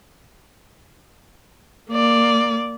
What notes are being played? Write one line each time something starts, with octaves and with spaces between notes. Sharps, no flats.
A#3 D5